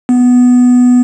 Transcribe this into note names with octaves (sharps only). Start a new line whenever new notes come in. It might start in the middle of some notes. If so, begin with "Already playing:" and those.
B3